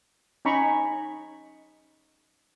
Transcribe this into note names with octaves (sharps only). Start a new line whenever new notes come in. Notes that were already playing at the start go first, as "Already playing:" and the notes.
C#4 D#4 A#5 B5 C#6